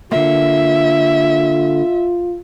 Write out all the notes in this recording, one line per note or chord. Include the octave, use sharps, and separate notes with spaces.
D3 A#3 F4 E5